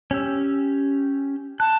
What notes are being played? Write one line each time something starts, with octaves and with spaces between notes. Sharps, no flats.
C#4 G4 E6
A5 F#6